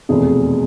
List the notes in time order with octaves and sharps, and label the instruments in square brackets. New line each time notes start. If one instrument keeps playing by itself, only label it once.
[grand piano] F1 E2 B2 G#4